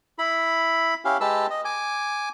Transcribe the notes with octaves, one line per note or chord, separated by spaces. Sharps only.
E4 B5
C#4 E4 G4 F5
G#3 G4 B4 A5 E6
D#5
G#5 D6